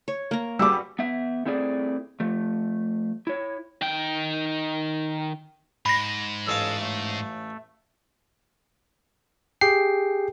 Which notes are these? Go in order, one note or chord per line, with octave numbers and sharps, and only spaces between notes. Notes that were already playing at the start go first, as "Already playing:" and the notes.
C#5
A#3 A#5
G3 F#4 G#4 B4 D6 E6
B3 E5
A3 C4 E4 G#4 D5
F3 A3
E4 C#5
D#3 G5
G#2 B5 A#6
A1 C#4 A4 D#5 F5 E6
A3
G4 G#4 G5 C7